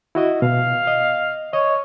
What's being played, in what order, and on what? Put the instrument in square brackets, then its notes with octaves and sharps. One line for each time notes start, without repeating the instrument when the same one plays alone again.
[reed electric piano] E4 F#4 D#5
[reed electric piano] B2 [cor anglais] F5
[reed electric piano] D#5
[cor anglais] C#5 [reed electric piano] D#5